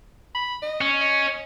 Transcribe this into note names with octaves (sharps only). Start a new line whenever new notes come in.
B5
D#5
C#4
D#5